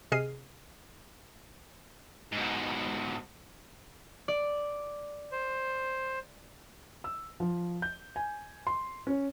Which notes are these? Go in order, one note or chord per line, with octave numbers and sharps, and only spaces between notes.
C3 G#4 D#5 F6 C7 D#7
G#2 B2
D5
C5
E6
F3
G6
G#5
C6
C#4